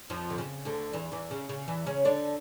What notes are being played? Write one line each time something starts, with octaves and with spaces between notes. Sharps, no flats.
F2 F3
D3
C#3
D2 D3
E2 E3
E2 E3
C#3
C#3
E2 E3
C#3 C#4
D3 D4